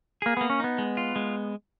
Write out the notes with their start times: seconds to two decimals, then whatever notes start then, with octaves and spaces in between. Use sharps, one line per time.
0.22 A#3 G#4
0.37 A#3 B3
0.50 C#4
0.60 B3 D#4
0.78 G#3
0.97 F4
1.16 G#3